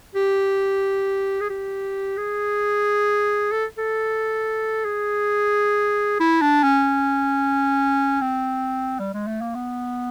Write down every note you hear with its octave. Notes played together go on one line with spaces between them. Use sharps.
G4
G#4
G4
G#4
A4
A4
G#4
E4
D4
C#4
C4
G3
G#3
A3
A#3
B3